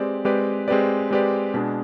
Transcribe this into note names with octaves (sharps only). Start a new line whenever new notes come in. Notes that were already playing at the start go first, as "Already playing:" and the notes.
Already playing: G#3 C4 G4 B4 D5
G#3 C4 G4 B4 D5
G#3 C4 G4 B4 D5
G#3 C4 G4 B4 D5
B2 G#3 D4